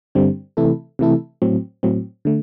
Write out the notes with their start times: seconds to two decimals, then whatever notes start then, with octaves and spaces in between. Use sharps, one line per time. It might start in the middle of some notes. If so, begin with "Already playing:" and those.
0.15 G2 D3 G3 C4
0.57 C3 E3 A3 E4 A4
0.99 C3 E3 A3 E4 A4
1.42 A2 F#3 C4
1.83 A2 F#3 C4
2.25 D3 A3